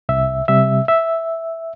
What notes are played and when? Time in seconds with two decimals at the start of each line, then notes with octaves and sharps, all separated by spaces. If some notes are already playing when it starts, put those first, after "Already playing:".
0.09 C2 E5
0.48 C3 G3 E5
0.88 E5